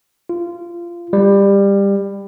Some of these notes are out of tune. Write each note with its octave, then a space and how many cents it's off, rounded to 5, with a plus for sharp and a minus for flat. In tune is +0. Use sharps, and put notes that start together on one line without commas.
F4 -20
G3 +20